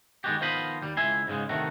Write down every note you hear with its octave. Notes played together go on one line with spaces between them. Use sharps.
D#3 G#3 B3 F#4 G4
D#3 F3 B3 C5 D#5 B5
D#2 G3
C#2 E4 E5 G#5 C6
G#2 C#3 G#3
A2 C3 D#3 A3 F#4